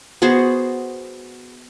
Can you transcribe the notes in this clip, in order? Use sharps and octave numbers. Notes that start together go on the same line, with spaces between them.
B3 F#4 G#4 C5